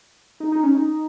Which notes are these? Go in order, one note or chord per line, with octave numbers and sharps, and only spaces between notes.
D#4
D#4
C#4
D#4